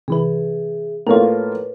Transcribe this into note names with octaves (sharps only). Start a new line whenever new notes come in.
C3 E3 G#4 B4 E5
A2 A#3 F4 A#4 B4 C#5